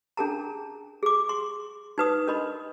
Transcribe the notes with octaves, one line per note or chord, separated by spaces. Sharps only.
C#4 D4 G#4 A#4 A5 A#5
G#4 D6
C6
D#4 B4 D#6
D4 A#4 D#5 B5 C6